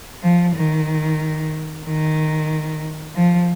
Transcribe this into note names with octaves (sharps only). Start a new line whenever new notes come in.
F3
D#3
D#3
F3